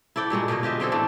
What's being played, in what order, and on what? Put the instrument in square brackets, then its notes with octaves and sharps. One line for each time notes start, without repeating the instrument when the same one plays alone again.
[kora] E4 A4 D5 G5
G2 A#2 G#3 F#4
B2 D3 G#4 D#5
F4 G4 D#5 E5
D3 C4 G#4 A4
A2 E3 A3 D4